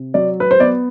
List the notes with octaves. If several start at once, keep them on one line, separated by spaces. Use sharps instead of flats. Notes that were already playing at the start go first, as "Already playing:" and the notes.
Already playing: C3
F#3 D5
B4
C5
B3 D5